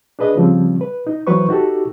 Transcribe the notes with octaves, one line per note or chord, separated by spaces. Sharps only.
D4 G#4 B4 D#5
C#3 F3 G3 C4
B4
D#4
E3 F#3 B4 C5 C#6
D#4 F#4 G4 A4